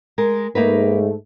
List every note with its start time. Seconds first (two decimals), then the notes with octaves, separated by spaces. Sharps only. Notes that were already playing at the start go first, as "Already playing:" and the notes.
0.18 G#3 A#4
0.55 G#2 A3 A#3 D#4 B4